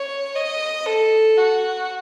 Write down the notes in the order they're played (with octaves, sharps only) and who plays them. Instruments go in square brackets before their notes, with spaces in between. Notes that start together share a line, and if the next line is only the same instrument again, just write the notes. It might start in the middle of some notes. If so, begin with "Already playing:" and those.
Already playing: [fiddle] C#5
D#5
A4
F#4